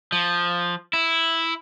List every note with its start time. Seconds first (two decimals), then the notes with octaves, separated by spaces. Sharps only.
0.12 F3
0.93 E4